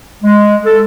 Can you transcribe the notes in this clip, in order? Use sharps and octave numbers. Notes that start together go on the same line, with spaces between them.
G#3
A4